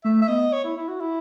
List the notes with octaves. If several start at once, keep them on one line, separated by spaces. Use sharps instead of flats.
A3 E5
E5
B3 D#5
C#5
E4
E4
F#4
E4